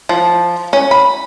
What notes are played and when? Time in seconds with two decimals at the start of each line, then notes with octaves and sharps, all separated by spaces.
0.09 F3
0.73 C#4
0.91 B5